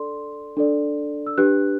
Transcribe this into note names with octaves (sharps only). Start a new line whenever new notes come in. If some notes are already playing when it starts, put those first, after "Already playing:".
Already playing: D4 A4 D5 C6
D4 A4 D5
E6
D4 G4 B4 F#6